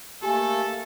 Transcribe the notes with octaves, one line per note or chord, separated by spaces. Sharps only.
A3 A#3 G4 A4 G#5